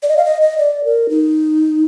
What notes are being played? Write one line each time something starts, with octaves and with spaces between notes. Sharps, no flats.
D5
D#5
F5
D#5
D#5
D5
A#4
D#4